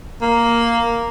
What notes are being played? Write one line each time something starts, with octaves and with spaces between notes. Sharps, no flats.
A#3